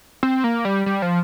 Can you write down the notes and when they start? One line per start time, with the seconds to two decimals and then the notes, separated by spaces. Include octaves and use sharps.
0.23 C4
0.44 A#3
0.65 G3
0.86 G3
1.02 F3